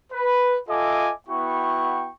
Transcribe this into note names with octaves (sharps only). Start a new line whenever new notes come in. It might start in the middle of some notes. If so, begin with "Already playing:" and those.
B4
F4 A4 D#5 E5 G#5 D6
B3 E4 F#4 G5 C#6